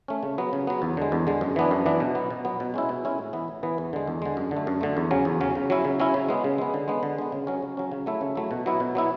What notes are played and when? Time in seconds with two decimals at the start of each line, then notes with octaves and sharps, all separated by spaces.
0.08 A3 C#4
0.23 C#3
0.38 F#3 B3
0.53 C#3
0.67 F#3 B3
0.82 E2
0.97 D3 G#3
1.12 E2
1.27 D3 G#3
1.41 F#2
1.56 E3 B3 D4
1.71 F#2
1.86 E3 B3 D4
2.00 B2
2.15 F#3 B3
2.31 B2
2.45 F#3 B3
2.60 B2
2.74 G#3 C#4 E4
2.89 B2
3.04 G#3 C#4 E4
3.18 A2
3.33 E3 B3
3.48 A2
3.63 E3 B3
3.78 E2
3.93 D3 G#3
4.07 E2
4.22 D3 G#3
4.37 F#2
4.51 D3
4.57 A3
4.67 F#2
4.81 D3 A3
4.97 E2
5.11 C#3 F#3 C#4
5.25 E2
5.41 C#3 F#3 C#4
5.55 C#3
5.70 F#3 C#4 E4
5.85 C#3
6.00 F#3 C#4 E4
6.14 C#3
6.29 G#3 B3
6.44 C#3
6.58 G#3 B3
6.74 D3
6.88 G#3 B3
7.03 D3
7.18 G#3 B3
7.32 C#3
7.47 F#3 C#4
7.62 C#3
7.77 F#3 C#4
7.92 C#3
8.06 F#3 A3 E4
8.21 C#3
8.36 F#3 A3 E4
8.51 B2
8.66 F#3 B3 E4
8.80 B2
8.95 F#3 B3 E4